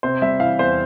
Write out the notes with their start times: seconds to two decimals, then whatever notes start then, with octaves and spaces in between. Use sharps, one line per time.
0.03 C3 C5
0.22 G3 E5
0.40 E3 F5
0.59 E2 C5